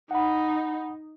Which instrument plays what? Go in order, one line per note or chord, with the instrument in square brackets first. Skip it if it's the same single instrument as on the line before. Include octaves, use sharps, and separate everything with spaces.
[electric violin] D#4 [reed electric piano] F#5 B5